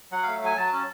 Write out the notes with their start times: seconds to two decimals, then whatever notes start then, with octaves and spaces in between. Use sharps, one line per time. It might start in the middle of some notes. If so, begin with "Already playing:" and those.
0.12 F#3 F#5
0.23 A3 F5
0.43 F#3 G#5
0.57 F#3 A5
0.72 C#4